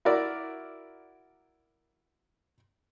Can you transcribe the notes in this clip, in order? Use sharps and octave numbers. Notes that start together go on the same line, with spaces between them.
E4 F#4 A#4 D5